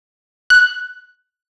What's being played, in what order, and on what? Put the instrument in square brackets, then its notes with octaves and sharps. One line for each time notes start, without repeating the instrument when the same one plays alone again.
[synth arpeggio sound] F#6